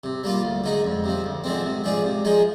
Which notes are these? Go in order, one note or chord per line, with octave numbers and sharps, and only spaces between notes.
C3
G3 A#3 F4
D2
D3 G#3 D#4
F2
C3 F3
D2
D3 F3 G#3 C4
C3
F3 G#3 D4 G#4
C3
F3 G#3 D#4 G#4